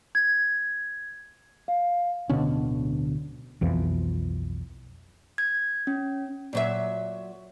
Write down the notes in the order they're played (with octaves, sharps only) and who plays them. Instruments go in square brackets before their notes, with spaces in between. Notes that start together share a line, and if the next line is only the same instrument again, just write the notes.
[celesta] G#6
F5
[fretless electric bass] D1 B2 D3 C#4
B1 F2 E3 F3
[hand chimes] G#6
C#4
[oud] A#2 F#3 E5